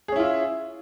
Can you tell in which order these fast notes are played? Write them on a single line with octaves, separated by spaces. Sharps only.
G#4 C#4 E4 F4 E5